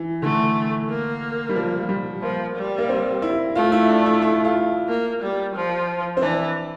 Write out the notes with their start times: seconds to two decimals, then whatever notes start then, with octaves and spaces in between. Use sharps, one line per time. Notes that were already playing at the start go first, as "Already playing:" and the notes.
Already playing: E3
0.22 D3 A3
0.90 A#3
1.49 G3
1.56 F3
1.80 F3
1.89 G3
2.22 F3 A#3
2.56 G3
2.78 A#3
2.89 C4
3.22 E4
3.55 A3 F4
3.72 E4
3.89 D4
4.06 E4
4.22 E4
4.45 F4
4.89 A#3
5.23 G3
5.56 F3
6.17 C4
6.22 E3 D4